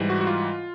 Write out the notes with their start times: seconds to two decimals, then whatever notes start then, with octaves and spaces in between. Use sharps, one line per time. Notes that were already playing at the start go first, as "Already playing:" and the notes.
Already playing: G#2 E3 G3
0.10 F#4
0.21 F#4
0.27 F4